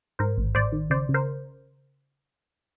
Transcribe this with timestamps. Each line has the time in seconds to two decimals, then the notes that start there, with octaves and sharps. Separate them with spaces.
0.19 G#2 A#4 C5
0.38 A1
0.55 A1 C5 D5
0.72 D#3
0.90 C#3 C5 D5
1.09 C#3
1.14 A#4 C5